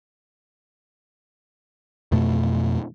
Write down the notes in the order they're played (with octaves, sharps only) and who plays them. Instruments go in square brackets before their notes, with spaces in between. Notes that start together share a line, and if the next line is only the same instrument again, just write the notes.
[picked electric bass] F2 B2 A3